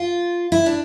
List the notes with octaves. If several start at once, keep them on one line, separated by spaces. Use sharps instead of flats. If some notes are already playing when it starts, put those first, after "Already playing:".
Already playing: F4
E4
D4